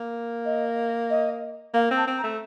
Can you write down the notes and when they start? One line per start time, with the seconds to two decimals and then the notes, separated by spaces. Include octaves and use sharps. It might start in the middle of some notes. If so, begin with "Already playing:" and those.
Already playing: A#3
0.45 D#5
1.10 D#5
1.74 A#3 F5
1.91 C4
1.96 A5
2.07 C4
2.18 A#5
2.23 A3